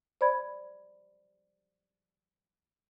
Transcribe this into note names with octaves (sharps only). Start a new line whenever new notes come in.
C5 D5 B5 G#6